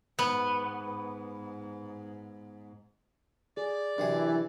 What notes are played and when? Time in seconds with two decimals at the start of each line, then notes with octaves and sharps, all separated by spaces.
0.19 G#2 B3
3.57 G#4 D5
3.98 F#2 C3 E3 D4 G#4